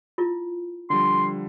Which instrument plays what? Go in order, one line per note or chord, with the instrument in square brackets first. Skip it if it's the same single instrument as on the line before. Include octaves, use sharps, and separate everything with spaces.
[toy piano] E4 F4
[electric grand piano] D3 F3 G3 [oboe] C6